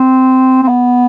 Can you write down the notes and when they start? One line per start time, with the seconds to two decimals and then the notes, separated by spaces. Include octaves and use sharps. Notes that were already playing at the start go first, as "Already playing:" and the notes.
Already playing: C4
0.63 C4
0.68 B3